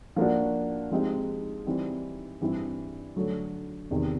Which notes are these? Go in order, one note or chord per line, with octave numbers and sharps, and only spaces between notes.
F3 A#3 D4 F#4
F3 G#3 C4 D#4 G4
E3 G3 C4 D#4
G2 E3 G3 C4 E4
D3 F#3 A3
E2 C3 D#3